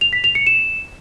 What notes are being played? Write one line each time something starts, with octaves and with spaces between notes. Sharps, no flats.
F7
B6
F7
C#7
E7